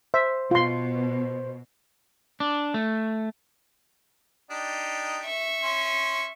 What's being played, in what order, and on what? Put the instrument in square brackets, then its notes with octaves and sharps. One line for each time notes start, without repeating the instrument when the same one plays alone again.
[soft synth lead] C5 [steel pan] E5
[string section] B2 [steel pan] F4 C6
[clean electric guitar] D4
A3
[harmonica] D4 D#4 G4
[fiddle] E5 C#6
[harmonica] C#4 C6